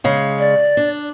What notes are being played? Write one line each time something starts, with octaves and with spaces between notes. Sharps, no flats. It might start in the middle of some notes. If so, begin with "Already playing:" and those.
C#3 G#3
D5
D4